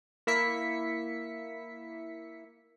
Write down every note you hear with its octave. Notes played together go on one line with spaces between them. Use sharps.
A#3 E4 E5 B6 C#7